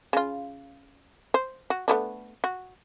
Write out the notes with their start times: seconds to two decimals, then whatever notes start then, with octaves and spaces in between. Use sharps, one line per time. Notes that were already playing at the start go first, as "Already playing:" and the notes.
0.13 C#3 F4
1.34 C5
1.70 F#4
1.88 A3 B3 D4
2.44 F#4